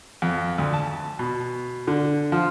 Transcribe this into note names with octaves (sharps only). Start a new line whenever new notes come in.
F2
D2
A5
B2
D3
F3